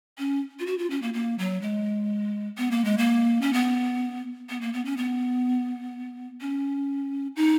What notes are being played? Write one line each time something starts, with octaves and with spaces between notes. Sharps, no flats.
C#4
F4
F#4
F4
C#4
A#3
A#3
F#3
G#3
B3
A#3
G#3
A#3
C#4
B3
B3
A#3
B3
C#4
B3
C#4
D#4